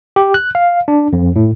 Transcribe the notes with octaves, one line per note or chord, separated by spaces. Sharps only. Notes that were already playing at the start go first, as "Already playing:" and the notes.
G4
F#6
F5
D4
F2
A2